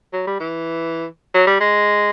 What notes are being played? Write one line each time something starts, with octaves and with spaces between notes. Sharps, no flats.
F#3
G3
E3
F#3
G3
G#3